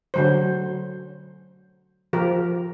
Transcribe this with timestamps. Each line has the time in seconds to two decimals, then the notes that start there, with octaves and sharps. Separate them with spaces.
0.14 D3 F#3 C5
2.13 F3 G4 A#4